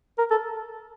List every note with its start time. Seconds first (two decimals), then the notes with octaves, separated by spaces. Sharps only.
0.18 A#4
0.31 A4